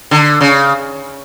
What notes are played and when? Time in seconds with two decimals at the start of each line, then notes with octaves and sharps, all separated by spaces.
0.11 D3
0.41 C#3